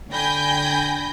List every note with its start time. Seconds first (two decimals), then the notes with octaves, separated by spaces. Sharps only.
0.11 D3 G5 G#5 B5 G6 A#6